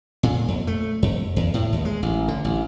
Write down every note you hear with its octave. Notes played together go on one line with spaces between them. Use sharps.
A#2
F2
A3
F2
E2
A2
D#2
G#3
A1
D3
A1